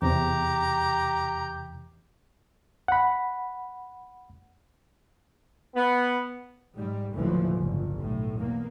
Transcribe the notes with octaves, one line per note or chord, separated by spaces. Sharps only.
E2 C3 E3 G4 A#5
F#5 B5
B3
G#2 G3
F#1 D#2 A2 D3 E3 F3
G1 C#2
B1 A2
E2 A#3